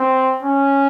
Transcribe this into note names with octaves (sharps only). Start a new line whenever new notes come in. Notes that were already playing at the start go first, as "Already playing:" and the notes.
Already playing: C4
C#4